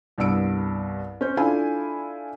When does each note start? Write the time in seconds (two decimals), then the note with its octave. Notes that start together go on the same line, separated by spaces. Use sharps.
0.18 C2 G2 B3 E6 D7
1.21 C#4 C5 G6
1.37 D4 E4 F4 A4 F5 G#5